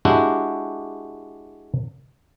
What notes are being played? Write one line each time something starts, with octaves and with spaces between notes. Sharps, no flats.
G#3 D4 E4 F#4 G4